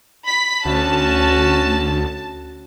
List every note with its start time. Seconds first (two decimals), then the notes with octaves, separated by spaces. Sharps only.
0.24 B5 B6
0.65 D2 C#4 F#4 A5